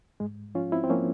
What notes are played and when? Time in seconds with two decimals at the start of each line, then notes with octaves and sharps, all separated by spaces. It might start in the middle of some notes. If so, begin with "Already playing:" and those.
0.20 G#2 G#3
0.55 F3 C#4 F4
0.72 C4 E4
0.84 C4
0.90 F3 A#3 C#4